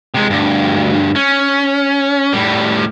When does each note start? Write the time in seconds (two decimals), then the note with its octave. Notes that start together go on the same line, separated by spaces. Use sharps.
0.14 C3 G#3
0.30 D2 G2
1.16 C#4
2.33 A2 G3